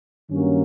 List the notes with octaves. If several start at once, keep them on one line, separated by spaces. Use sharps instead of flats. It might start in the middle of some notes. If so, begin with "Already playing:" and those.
G2 D#3 F#3 A#3 C#4